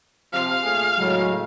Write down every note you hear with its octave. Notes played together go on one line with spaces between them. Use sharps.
C3 F3 F5
A#2 A3 G#4
A2 C#3 F#3 G#3